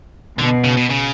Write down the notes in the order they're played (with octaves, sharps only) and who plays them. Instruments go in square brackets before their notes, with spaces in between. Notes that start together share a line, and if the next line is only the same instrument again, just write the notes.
[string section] B2 [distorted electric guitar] D3
[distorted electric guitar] C#3
B2
C#3